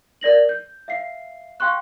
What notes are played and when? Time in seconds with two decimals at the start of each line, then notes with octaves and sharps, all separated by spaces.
0.21 A#4 D5 A#6 F#7
0.49 G6
0.88 E5 F5 C7
1.60 F5 G5 C6 C#6 F#6